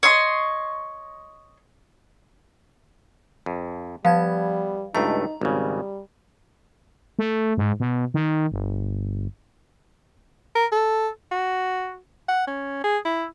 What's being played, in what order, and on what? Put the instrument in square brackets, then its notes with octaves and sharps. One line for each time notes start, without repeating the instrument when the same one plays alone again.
[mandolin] C#5 D#5 C6
[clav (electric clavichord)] F2
[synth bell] F3 A5 G#6 [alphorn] G3 [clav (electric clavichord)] B3 [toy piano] B4 F5
[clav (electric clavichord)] C#2 G2 A3 [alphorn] D#4 [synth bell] A#5
[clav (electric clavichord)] G#1 C#3 [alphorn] G3
[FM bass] A3
G#2
B2
D#3
G1
[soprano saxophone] A#4
A4
F#4
F#5
C#4
G#4
E4